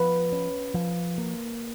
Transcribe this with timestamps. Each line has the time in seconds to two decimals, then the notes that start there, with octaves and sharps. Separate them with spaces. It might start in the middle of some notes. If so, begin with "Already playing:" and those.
Already playing: F3 B4
0.32 C#4
0.74 F3
1.18 A#3